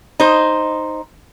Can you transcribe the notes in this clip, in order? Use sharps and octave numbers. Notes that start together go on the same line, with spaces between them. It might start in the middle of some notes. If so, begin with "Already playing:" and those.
D#4 C5